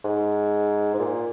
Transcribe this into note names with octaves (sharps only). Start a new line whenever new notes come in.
G#2
G#2
A#2